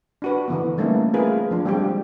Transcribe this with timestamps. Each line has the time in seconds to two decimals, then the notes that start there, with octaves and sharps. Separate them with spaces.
0.22 D4 F#4 B4
0.48 D3 E3 B3
0.78 G3 A3 A#3 C#4 D#4
1.13 A3 C4 F4 G#4 A#4 B4
1.51 F3 D4
1.65 G3 G#3 C4 D4 G4